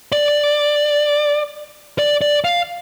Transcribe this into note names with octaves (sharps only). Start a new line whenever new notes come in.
D5
D5
D5
F5